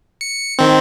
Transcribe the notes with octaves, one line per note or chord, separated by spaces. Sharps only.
C#7
D#3 C4